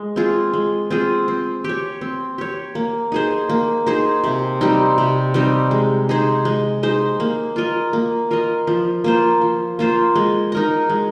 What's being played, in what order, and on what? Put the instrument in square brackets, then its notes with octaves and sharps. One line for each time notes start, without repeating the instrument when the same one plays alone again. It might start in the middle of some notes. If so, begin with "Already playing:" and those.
Already playing: [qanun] G#3
C4 F4 G#4
G#3
C4 F4 G#4
C4
G4 C#5
C4
G4 C#5
A#3
D#4 G#4 C5
A#3
D#4 G#4 C5
C3
G3 C4 D#4
C3
G3 C4 D#4
G#3
D#4 G#4 C5
G#3
D#4 G#4 C5
A#3
F4 A#4 D#5
A#3
F4 A#4 D#5
F3
A#3 F4 C5
F3
A#3 F4 C5
G#3
D#4 A#4 D#5
G#3